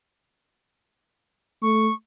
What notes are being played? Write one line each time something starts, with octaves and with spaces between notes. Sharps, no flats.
A3 C#6